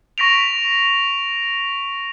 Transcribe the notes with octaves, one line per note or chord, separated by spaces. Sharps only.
C#6 A#6 B6 D7 F7